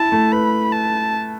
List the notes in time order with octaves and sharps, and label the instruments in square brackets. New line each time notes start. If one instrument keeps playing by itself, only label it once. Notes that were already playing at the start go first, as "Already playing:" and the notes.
Already playing: [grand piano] E4 [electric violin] A5
[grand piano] A3
[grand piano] B4 [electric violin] B5
[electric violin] A5